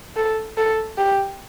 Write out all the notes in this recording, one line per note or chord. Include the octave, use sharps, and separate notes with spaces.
A4
A4
G4